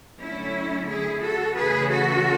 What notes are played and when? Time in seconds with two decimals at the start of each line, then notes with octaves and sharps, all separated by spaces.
0.21 D3 F#3 A3 C#4 E4
0.88 E4 G#4
1.22 F#4 A4
1.56 C#3 E3 A3 G#4 B4
1.90 F#4 A4